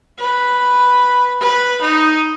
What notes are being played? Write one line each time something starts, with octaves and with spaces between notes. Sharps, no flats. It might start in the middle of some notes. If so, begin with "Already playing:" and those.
B4
B4
D#4